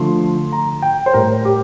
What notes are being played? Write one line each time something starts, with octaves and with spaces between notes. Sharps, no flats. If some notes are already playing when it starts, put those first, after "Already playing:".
Already playing: D3 F3 A3 C6
A#5
G5
C5
A2 G3 A#4
G4